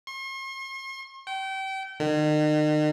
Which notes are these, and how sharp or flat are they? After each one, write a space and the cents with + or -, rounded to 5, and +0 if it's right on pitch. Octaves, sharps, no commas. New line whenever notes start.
C6 +45
G5 -30
D#3 -40